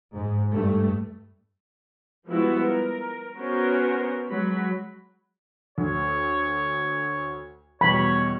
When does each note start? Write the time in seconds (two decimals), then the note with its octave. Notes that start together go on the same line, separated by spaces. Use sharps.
0.15 G#2
0.54 G2 A3
2.27 F3 G3 G#3 B3 E4 F#4
2.67 A#4
3.37 B3 C#4 F#4 A#4 C5
4.29 F#3 G#3 B5
5.78 D2 C#5
7.81 E2 B2 G3 C#5 B5